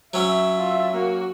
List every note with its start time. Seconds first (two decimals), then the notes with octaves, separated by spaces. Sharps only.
0.14 F#3 C#4 E5
0.58 F4
0.93 A#3 F#4